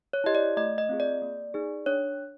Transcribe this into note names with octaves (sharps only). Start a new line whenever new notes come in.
C#5
E4 G4 D#5
D5
A3 D#5
D#5
C4 F4 G#4
D5
A#3
D#4 G#4
D4 C#5